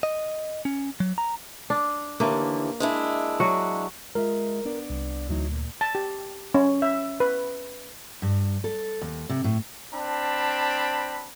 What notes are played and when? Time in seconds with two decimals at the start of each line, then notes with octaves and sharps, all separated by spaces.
0.03 D#5
0.65 C#4
1.00 F#3
1.18 A#5
1.70 D4
2.20 D#2 D3 E3 A#3
2.80 G#3 D4 E4
3.40 F#3 F#4
4.15 G#3 F4 A#4 E5
4.65 B3 D4 D5
4.90 C2
5.29 D2 E3 F#3 D#4
5.51 A#2
5.81 A5
5.95 G4
6.55 C#4
6.82 E5
7.20 B4
8.22 G2
8.64 A4
9.01 D#2
9.29 C3
9.44 A2
9.93 C4 D4 A5 B5